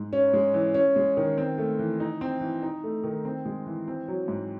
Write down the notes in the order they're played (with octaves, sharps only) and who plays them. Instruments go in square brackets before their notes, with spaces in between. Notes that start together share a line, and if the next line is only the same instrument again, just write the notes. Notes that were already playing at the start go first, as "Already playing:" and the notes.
Already playing: [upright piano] G#2
C#4
G#3
E3
C#4
G#3
D#3
C4
A3
E3
D#4
C4
E3
D#4
A3
D#3
C4
G#3
E3
C4
F#3
G#2